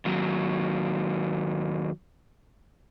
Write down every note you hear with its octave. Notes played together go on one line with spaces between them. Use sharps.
D#2 F#3